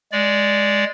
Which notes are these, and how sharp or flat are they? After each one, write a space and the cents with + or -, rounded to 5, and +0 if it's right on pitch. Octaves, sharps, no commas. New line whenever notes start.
G#3 +0 D5 -5